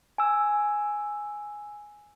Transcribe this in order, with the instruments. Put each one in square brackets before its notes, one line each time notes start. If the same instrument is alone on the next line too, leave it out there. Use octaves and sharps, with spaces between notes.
[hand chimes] G#5 E6